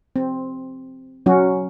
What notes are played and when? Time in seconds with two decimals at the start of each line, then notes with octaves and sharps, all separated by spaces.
0.16 C4
1.26 F#3 C#4 F#4